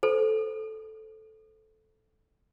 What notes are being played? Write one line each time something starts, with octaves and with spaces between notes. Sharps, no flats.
A4 C5